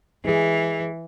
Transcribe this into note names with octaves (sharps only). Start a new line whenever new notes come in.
E3 G#3 G#4